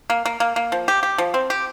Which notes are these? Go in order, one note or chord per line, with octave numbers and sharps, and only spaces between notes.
A#3
A#3
A#3
A#3
F3
G4
G4
F3
C4
G4